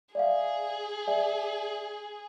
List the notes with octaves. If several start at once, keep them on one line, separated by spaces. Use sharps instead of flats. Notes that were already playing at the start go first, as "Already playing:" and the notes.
G#4 D5 E5 F5
D5 E5 G#5